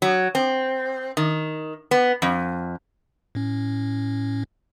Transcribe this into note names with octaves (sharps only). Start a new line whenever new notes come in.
F#3
C4
D#3
B3
F2
A2 C#4